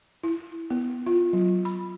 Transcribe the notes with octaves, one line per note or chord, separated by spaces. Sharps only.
E4
B3
F4
F#3
B5